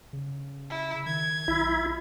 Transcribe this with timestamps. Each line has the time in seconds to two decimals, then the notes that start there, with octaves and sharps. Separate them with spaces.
0.13 C#3
0.70 E4
1.06 D#3 G#6
1.48 B1 E4